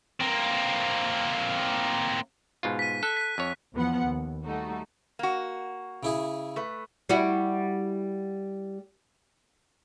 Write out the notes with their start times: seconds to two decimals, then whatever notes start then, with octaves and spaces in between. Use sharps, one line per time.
0.20 A#3 C4
2.63 G#2 B2 F4
2.79 B6 D#7
3.03 A4 F#6
3.17 F#6 B6
3.38 F2 C#5
3.74 E2 F3 B3 F#5
4.03 D#2
4.44 G3 A3 D#4 F#4
5.19 A#3 F#4
6.03 C#3 E4 G#4
6.56 A3 B4
7.09 G3 E4 F#4